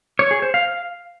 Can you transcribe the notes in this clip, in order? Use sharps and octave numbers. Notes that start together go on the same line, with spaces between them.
C#5
G#4
C5
F5